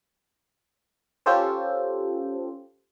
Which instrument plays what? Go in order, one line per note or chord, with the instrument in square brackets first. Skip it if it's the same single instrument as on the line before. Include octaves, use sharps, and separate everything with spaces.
[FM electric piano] C#4 F4 G4 A4 C5